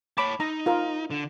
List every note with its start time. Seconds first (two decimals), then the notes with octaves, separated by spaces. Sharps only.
0.18 C#5 A5 B5 D6
0.40 D#4 A#5
0.66 F4 A#4
1.10 D3